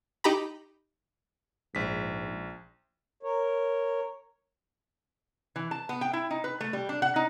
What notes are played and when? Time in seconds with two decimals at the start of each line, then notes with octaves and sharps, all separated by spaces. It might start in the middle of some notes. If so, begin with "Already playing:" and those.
0.24 D#4 G4 A#5 B5
1.75 A#1 G#2 B6
3.23 A#4 C#5
5.56 E3
5.71 A5
5.89 B3
6.01 G5
6.13 E4
6.31 D#4
6.44 B4
6.61 A3
6.73 G3
6.89 D4
7.02 F#5
7.16 D#4